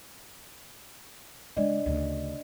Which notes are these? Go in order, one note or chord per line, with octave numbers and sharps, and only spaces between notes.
C#3 G#3 D4 D5 D#5
D2 C#3